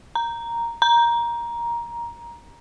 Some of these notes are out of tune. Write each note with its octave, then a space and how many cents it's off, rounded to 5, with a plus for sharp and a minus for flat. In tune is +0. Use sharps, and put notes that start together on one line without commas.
A#5 +0
A#5 +15